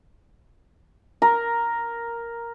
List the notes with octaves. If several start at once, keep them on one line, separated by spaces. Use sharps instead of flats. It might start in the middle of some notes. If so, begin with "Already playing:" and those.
A#4